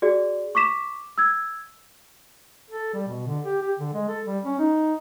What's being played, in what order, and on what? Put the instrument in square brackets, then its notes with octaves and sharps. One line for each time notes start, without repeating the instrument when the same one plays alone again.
[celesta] F#4 G#4 D5
C#6 D6 B6 E7
E6 G#6
[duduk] A4
G3
B2
D3
G4
G4
D3
G#3
A4
G3
C#4
D#4